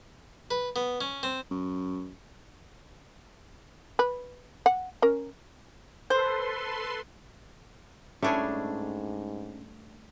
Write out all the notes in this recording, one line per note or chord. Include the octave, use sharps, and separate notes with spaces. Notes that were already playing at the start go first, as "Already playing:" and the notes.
B4
B3
C#4
C4
F#2
B4
F#5
C#4 A#4
A4 B4 C5 C6
G#2 G3 A3 C#4 D4 E4 G#4 C#5